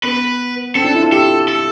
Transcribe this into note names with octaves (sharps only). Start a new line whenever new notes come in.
B3 B4
C4 A4
D4
E4
F4
G4 A4
A4